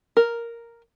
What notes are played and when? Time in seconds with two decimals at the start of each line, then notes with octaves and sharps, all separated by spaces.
0.17 A#4